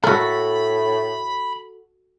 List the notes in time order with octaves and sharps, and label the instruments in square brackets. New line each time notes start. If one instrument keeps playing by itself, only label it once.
[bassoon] A2 [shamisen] A3 A#4 [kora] F#4 A4 [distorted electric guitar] B5